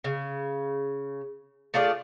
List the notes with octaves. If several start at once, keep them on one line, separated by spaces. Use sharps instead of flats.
C#3
A3 F4 G#4 D5